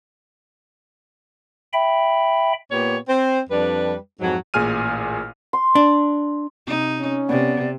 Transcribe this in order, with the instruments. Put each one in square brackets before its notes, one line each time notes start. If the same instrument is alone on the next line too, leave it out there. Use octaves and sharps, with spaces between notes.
[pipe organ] E5 G5 B5
[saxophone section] A#2 B3 G4 C#5
C4 C5
F2 G3 D4 B4
F2 G#2 F#3
[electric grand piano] A1 A#2 G#4 G#5 F6 D#7
[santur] C6
[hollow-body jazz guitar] D4
[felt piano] C3 [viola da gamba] D#4
[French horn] C#4
[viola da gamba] C3 [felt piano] B3 [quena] D5